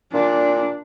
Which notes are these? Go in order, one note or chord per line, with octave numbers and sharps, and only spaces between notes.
A#2 D4